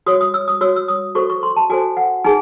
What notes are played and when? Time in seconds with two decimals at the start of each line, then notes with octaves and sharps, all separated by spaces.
0.06 F#4 C#5 D#6
0.21 D#6
0.34 E6
0.48 D#6
0.61 F#4 C#5 E6
0.76 E6
0.88 D#6
1.15 F#4 A4 C5 C#6
1.30 C#6
1.43 C6
1.56 A5
1.70 F#4 A4 C5 G#5
1.97 F#5
2.25 D#4 G#4 G#5